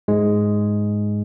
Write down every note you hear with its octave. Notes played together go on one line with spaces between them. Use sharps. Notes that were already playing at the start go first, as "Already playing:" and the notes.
G#2 G#3